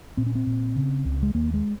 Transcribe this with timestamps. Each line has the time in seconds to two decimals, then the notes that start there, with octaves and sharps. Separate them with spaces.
0.17 A#2 C4
0.26 C#4
0.35 C4
0.47 A#2
0.76 C#3
1.05 C#2
1.23 G#3
1.34 D#2 A#3
1.54 G#3